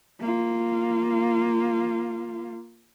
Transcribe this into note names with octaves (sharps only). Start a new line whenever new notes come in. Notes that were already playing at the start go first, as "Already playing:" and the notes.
A#3 F4